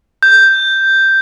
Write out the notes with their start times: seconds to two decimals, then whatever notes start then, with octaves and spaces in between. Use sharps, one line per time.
0.23 G6